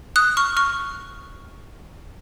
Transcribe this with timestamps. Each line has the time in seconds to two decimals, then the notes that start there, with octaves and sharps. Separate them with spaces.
0.16 D#6 F#6
0.37 C#6 F6
0.57 C#6 F6